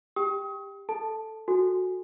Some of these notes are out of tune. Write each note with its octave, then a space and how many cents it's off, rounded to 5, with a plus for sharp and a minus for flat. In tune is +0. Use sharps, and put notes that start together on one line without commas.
G4 +15 G5 +0 D#6 +35
A4 +0 A5 +0
F#4 -10 A4 +0 G#5 +0